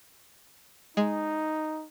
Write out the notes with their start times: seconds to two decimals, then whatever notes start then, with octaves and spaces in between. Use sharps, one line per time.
0.97 G#3 D#4